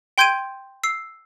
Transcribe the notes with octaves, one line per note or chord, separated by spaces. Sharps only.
G5 C6 G6 G#6 D7 D#7
E6 C7